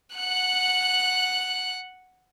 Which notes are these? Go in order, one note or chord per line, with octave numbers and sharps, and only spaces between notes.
F#5 F#6